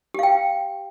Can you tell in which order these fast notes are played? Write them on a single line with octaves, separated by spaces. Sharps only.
G4 F5 G5